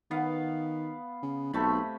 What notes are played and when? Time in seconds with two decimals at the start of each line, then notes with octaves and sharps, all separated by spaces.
0.11 D#3 B3 F5
1.23 C#3
1.53 B1 C3 A3 B5